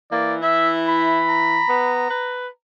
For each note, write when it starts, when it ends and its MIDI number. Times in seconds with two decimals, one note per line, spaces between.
0.12 1.60 52
0.12 0.36 58
0.12 0.35 74
0.42 1.21 64
0.42 0.72 76
0.88 2.01 83
1.29 2.54 82
1.69 2.10 59
2.10 2.48 71